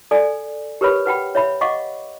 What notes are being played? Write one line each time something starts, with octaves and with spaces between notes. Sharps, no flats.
A4 D5 G#5
G4 A#4 B4 C#5 B5
B4 F#5 G5 B5
C#5 E5 B5
D#5 F5 F#5 C#6 D6